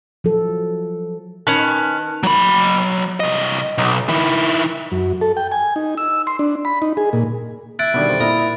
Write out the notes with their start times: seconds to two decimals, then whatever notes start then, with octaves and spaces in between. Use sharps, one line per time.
0.24 F3 F#3 A4
1.47 D#3 C#4 B4 A5 F#6 F7
2.23 F#3 B5
3.20 C2 D#5
3.78 B1
4.09 D#3 E4
4.92 F#2
5.21 A4
5.37 G5
5.52 G#5
5.76 D#4
5.98 E6
6.27 C6
6.39 D4
6.65 B5
6.82 D#4
6.97 G#4
7.13 A#2
7.79 E4 F#6 A6 D7
7.94 B2 D3 D#3 G3
8.08 F2
8.20 A#2 E4 A#4 D#5